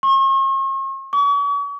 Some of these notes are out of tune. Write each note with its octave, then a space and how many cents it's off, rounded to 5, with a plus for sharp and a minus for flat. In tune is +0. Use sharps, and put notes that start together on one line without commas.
C#6 -45
C#6 +40